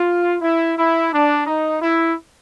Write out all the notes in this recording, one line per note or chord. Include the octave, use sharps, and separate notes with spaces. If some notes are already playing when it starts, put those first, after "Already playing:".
Already playing: F4
E4
E4
D4
D#4
E4